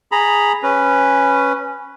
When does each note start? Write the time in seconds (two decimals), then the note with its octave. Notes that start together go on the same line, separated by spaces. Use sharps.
0.12 G#4 A#5 B5
0.63 C#4 B4